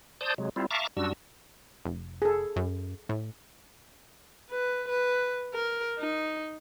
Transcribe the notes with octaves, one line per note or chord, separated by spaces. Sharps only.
C5 D5 A5 D#6 G6
C3 F#3 G#3
G3 C4 E4 F4
E5 F5 A5 A#5 C#6 D6
F#2 G3 D4 F#4 E6
F1
G#4 A4
F#2
A2
B4
B4
A#4
D#4